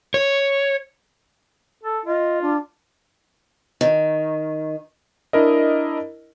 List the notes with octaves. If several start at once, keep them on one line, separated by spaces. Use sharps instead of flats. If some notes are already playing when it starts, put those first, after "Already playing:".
C#5
A4
F4 D#5
D4
D#3
D4 E4 A#4 D#5